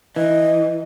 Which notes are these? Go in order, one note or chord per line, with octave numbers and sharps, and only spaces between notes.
E3 D#5